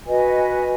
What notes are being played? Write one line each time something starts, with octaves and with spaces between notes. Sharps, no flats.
F#4 B4 D#5 G#5